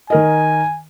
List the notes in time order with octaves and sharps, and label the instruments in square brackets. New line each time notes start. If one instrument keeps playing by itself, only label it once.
[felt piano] D#3 A#4 D#5 [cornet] G#5